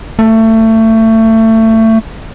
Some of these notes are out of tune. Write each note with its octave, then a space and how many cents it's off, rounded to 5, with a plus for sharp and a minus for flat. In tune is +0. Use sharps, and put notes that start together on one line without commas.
A3 +25